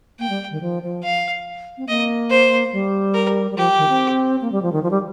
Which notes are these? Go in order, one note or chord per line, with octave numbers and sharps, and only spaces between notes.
A#3 G5
G3
D#3
F3
F3
F5
C4
A#3 D#5
C5
G3
A#4
G3
F3 G4
D#3
C4
A#3
G3
F3
D#3
F3
G3